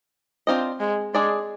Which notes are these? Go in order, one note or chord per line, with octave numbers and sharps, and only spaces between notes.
C4 D4 F4 C5 D#5
G#3
G#3 D4 G#4 D5